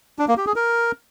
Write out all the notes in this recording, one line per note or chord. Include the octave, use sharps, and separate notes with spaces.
D4
A#3
G4
G#4
A#4